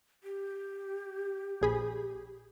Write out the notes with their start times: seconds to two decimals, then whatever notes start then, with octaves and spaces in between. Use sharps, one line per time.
0.24 G4
1.62 A#1 G#4 B5